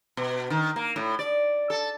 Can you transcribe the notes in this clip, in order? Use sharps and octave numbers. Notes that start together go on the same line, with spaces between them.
B2
D#3
A#3
A2
D5
A4